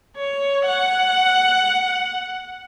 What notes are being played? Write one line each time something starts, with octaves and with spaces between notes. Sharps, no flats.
C#5
F#5